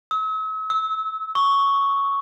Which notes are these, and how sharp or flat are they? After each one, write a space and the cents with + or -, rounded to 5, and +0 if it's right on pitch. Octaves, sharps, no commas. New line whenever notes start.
E6 -45
E6 -25
C#6 +5